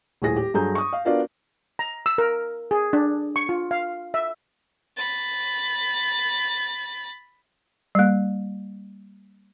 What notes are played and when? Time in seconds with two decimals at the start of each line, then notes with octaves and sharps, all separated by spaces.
0.22 D#1 A2 G#4 A#6
0.36 G4
0.54 G2 F#3 G#4 A4 A#5 G6
0.75 C#6 D#6
0.93 F5
1.05 B3 D4 F4 F#4 A#4 D5
1.79 A#5
2.06 E6
2.18 A#4
2.71 G#4
2.93 D4
3.36 C#6
3.49 F4
3.71 F5
4.14 E5
4.97 B5 A6
7.95 G3 A#3